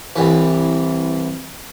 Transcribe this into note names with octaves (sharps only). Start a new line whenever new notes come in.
C2 E3